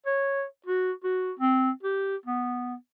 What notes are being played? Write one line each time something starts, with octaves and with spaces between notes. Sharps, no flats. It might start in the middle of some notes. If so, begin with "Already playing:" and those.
C#5
F#4
F#4
C4
G4
B3